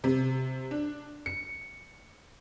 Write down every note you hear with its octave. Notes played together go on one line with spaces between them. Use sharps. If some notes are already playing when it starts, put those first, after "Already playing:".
C3
D4
C#7